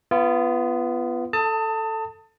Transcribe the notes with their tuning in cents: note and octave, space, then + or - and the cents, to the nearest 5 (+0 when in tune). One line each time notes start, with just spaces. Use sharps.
B3 +5 F4 -30
A4 +0 A5 +25 D#6 +15